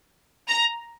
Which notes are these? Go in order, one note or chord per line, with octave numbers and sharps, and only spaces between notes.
A#5